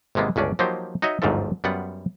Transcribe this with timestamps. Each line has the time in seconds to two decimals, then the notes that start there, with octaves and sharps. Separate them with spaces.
0.15 G#1 C3 G#3 A#3 B3
0.36 G1 C#2 C#4 D4 D5
0.59 F3 F#3 A#3 D#4 G4 C5
1.02 D#4 F#4 C#5 D#5 E5
1.22 G1 D2 G#2 D#3 F3 A4
1.64 F#2 G3 B3 F4 F#5